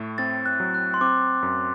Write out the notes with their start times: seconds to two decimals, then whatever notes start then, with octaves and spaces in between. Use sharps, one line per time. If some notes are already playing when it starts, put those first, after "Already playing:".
Already playing: A2 A3
0.18 C4 A6
0.46 F#6
0.60 F#3
0.74 F#6
0.94 C6
1.01 C4 D6
1.43 F#2